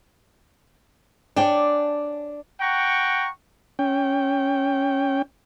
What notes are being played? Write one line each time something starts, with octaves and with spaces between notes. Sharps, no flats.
D4 C#5 G5 G#5
F#5 G5 A#5 C#6
C#4 G5